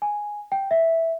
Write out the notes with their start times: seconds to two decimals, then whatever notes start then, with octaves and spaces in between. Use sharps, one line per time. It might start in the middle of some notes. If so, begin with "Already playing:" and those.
0.02 G#5
0.52 G5
0.71 E5